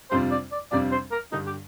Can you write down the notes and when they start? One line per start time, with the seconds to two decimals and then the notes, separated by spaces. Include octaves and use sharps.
0.11 F2 C3 G3 D4 F4 C5
0.31 D5
0.52 D5
0.71 F2 C3 G3 D4 F4 D5
0.92 C5
1.11 A#4
1.32 G2 D3 G3 D#4
1.46 G4